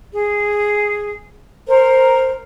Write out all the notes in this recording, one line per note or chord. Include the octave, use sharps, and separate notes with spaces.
G#4
A#4 C5